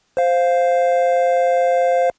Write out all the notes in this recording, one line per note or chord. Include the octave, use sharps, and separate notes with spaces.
C5 F5